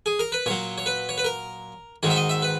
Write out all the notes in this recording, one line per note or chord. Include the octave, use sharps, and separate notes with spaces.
G#4
A#4
B4
A#2 F#3 C#5
C#5
B4
C#5
B4
A#4
G#2 D#3 F#3 C#5
E5
D#5
E5
B4